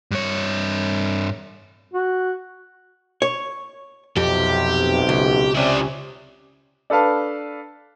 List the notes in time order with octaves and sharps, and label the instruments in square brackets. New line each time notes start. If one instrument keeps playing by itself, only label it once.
[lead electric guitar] G2 C#5
[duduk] F#4
[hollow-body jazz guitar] C#5
[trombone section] B1 C3 [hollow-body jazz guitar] F2 [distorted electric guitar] G4
[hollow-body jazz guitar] C#2
[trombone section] C3 C#4 [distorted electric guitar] E4 D5
[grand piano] D4 A4 B4 F5 A5